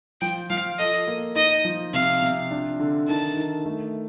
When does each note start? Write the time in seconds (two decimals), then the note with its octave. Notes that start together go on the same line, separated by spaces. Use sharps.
0.21 F3 G5
0.50 F3 F5
0.79 A4 D#5
1.07 A#3
1.36 D#4 D#5
1.65 F3
1.93 C3 F5
2.22 C3
2.51 D4
2.79 D3
3.08 D#3 A5
3.37 D#3
3.66 A3